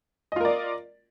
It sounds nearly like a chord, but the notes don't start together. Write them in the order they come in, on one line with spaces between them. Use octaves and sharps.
D#5 F4 A#4 D5